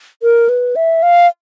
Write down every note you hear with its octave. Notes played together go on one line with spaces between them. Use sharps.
A#4
B4
E5
F5